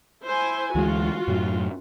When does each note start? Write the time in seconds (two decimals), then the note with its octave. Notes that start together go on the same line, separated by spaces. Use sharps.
0.23 E4 C5 G#5
0.75 D2 E3 G#3 F4 F#4
1.28 F#2 A2 F#3